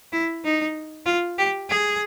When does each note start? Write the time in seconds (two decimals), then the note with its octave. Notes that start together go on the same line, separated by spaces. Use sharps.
0.13 E4
0.44 D#4
1.06 F4
1.38 G4
1.69 G#4